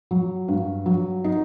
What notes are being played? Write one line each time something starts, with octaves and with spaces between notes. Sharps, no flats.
F#3
G2
F#3
D#4